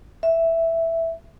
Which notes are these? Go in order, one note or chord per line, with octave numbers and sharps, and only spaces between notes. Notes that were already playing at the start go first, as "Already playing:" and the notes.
E5